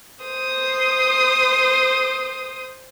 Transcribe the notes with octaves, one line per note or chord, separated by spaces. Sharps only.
C5 D#6